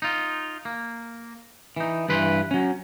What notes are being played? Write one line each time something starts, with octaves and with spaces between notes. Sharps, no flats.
D#4 F4
A#3
E3 D#4
G2 E3 B4 C6
F#3 C#4